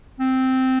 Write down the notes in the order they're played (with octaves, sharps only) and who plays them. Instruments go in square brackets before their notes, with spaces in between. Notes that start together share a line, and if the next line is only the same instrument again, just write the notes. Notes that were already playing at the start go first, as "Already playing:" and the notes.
[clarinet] C4